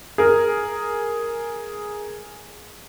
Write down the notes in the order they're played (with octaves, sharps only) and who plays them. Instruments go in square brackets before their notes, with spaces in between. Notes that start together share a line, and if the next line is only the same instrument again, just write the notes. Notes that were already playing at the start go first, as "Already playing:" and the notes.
[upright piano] G#4 A#4